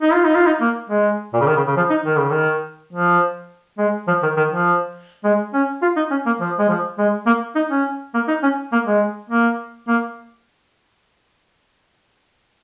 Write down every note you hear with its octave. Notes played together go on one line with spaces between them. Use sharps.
D#4
F4
D#4
F4
D#4
A#3
G#3
A#2
C#3
D#3
C#3
C#3
F3
D#4
D#3
C#3
D#3
F3
G#3
F3
D#3
D#3
F3
G#3
C#4
F4
D#4
C#4
A#3
F3
G#3
F3
G#3
A#3
D#4
C#4
A#3
D#4
C#4
A#3
G#3
A#3
A#3